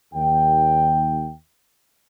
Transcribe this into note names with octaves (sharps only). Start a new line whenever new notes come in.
D#2 G5